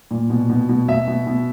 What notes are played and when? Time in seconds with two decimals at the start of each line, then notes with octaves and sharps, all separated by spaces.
0.11 A#2
0.30 B2
0.50 B2
0.69 B2
0.88 B2 E5
1.08 B2
1.27 B2